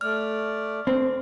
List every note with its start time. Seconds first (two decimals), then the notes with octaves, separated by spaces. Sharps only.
0.01 A3 D5 F6
0.87 C4